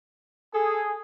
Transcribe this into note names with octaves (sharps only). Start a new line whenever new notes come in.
G#4 A4